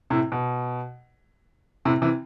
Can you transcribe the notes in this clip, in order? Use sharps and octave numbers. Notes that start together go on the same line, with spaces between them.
A2 C3
B2
A2 C3
C3 E3